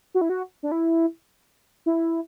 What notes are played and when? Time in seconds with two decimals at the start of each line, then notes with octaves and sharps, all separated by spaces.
0.14 F#4
0.21 E4
0.29 F#4
0.63 D4
0.72 E4
1.86 E4